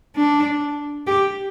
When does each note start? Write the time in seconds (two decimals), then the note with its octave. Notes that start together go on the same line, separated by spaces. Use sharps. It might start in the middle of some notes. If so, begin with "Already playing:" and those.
0.16 D4
1.07 G4